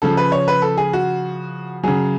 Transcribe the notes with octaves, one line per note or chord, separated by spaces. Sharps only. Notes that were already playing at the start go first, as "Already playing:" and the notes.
C#3 F3 A4
B4
C#5
B4
A4
G#4
F#4
C#3 F#3 G#4